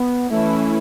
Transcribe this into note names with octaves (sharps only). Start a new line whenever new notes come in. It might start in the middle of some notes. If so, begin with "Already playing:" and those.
Already playing: B3
E3 A3 C#4 E4